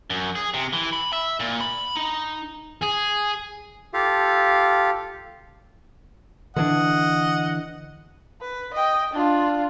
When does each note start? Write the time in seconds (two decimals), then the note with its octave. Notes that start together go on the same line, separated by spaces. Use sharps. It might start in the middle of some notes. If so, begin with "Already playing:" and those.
0.10 F#2
0.35 G#4
0.54 C3
0.73 E3
0.93 B5
1.13 E5
1.40 A#2
1.61 B5
1.96 D#4
2.82 G#4
3.93 F4 G4 A4 F5
6.56 D3 E3 D4 D#5 F#5
8.41 B4
8.73 D#5 G5
9.13 D4 F4